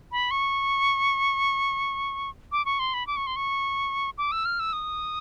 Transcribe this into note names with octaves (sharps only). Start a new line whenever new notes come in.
B5
C#6
D6
C#6
C6
B5
D6
C#6
C6
C#6
D6
E6
F6
E6
D#6